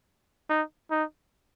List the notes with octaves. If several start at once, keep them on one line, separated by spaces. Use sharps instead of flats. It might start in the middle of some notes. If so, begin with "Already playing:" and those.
D#4
D#4